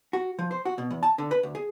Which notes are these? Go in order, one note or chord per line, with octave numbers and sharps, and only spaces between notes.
F#4
F3
C5
F#4
B2
E2
A5
D3
B4
D2
G#4